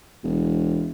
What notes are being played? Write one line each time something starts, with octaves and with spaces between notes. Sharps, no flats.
E1